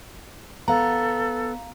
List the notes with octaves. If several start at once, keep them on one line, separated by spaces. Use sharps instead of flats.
B3 A4 F5 A#5